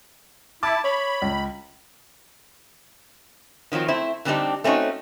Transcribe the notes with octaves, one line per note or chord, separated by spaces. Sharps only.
E4 A5 D6 B6
C#5 B5
C#2
D#3 F3 F#3 C4 F4
A3 C4 E4 C5
D3 G3 C4 D4 D#4 G4
A3 C4 C#4 D#4 F#4